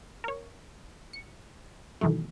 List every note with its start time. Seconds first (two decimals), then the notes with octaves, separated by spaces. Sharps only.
0.24 A#4 C#5
1.13 C#7
2.01 B2 D#3 E3 F#3 A3